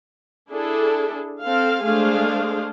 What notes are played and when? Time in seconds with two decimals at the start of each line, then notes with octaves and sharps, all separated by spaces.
0.50 D4 E4 G#4 A4
1.42 C4 A4 F5
1.84 G#3 A3 D4 G#4 C5 F5